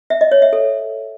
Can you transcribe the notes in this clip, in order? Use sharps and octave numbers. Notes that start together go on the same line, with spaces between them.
E5
D#5
C#5
E5
A4